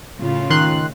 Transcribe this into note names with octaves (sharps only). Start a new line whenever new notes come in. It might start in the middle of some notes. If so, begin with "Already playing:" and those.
A2 C#3 F4
D#3 C6 F#6